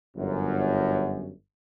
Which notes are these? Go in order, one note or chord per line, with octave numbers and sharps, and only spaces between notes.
G1 F#2